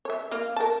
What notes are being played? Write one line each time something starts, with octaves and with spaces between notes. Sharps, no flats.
C#5 E5
A#3 D#5 F5
A#4 A5